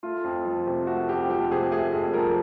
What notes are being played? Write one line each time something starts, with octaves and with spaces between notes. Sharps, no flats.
A3 F4
F2
F3
C3
A3 F#4
F2 G4
F3 G4
C3 G#4
A3 G#4
F2
F3 A#4